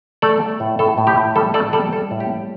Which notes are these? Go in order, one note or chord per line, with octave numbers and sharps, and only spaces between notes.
A3 A4 D5
A3
A2
A2 A4
A2
G4
A2
G3 A4
G3 A4 D5
G3 A4 D5
G3 A4
A2
G4
G3